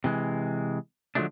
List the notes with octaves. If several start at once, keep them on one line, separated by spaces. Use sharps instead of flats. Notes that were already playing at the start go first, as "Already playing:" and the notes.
C3 E3 G#3
D3 F3 F#3 G#3 A3 D4